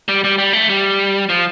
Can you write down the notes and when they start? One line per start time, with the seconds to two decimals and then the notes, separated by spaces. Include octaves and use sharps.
0.08 G3
0.24 G3
0.38 G3
0.53 A3
0.70 G3
1.29 F3